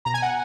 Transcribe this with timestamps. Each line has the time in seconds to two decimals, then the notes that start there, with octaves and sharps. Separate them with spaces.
0.05 B2 A#5
0.14 G#5
0.22 F#5